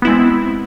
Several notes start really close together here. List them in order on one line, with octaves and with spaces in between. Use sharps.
B3 E4 G#3 C4